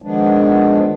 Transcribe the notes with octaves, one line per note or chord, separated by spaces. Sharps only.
D#3 F3 G#3 B3 D4